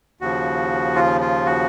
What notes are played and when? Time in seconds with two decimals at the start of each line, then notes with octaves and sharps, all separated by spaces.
0.21 D#2 C#3 F3 F#4
0.96 F4
1.21 F4
1.46 F#4